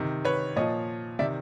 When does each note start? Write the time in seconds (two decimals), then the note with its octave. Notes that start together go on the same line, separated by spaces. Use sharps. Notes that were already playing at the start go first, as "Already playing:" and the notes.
Already playing: C3 D#3
0.25 B4 C#5
0.56 A#2 F3 C#5 D#5
1.19 C3 D#3 D5 E5